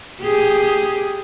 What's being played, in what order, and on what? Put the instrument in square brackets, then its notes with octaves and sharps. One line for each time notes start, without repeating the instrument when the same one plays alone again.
[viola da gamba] G4 G#4